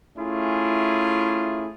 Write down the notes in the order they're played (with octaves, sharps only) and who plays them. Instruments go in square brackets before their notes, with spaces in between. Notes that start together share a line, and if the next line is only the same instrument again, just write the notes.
[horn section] A3 C#4 E4 F4 G#4